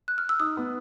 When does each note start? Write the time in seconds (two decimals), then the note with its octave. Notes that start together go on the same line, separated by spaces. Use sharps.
0.08 F#6
0.18 F6
0.29 E6
0.40 D#4 D#6
0.57 B3